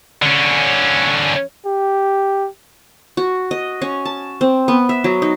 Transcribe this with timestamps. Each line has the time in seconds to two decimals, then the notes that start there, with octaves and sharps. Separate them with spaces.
0.22 D3 C#4
1.66 G4
3.17 F#4
3.51 D#5
3.82 C#4
4.05 A5
4.41 C4
4.68 B3
4.89 E5
5.04 F#3
5.22 D#4